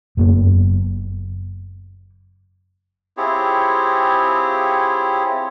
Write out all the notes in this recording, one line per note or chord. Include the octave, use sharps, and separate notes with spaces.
F#1 F#2 A#3 B3
C4 E4 F4 G4 G#4 C#5